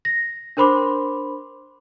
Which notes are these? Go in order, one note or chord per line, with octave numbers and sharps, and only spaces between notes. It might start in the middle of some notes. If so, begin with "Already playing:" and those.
A#6
D4 A#4 C5 B5 C6 D6